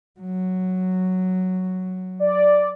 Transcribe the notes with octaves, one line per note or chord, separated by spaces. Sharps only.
F#3
D5